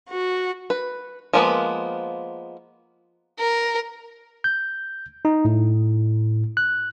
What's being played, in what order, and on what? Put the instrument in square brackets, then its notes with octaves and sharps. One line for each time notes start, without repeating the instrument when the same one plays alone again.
[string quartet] F#4
[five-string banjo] B4
F3 G#3 A#3 B3 B4
[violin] A#4
[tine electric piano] G6
D#4
A2
F#6